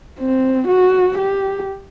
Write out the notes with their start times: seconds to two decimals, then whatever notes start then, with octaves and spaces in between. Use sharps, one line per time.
0.20 C4
0.68 F#4
1.18 G4